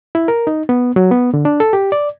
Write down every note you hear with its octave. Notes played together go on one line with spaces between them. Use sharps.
E4
A#4
D#4
B3
F#3
B3
D3
D4
A4
G4
D5